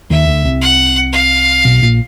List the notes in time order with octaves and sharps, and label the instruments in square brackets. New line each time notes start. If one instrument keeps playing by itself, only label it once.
[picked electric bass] D#2 D#3 [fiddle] E5
[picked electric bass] D2 D3
C2 C3
[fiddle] F#5
F5
[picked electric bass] B1 B2
A#1 A#2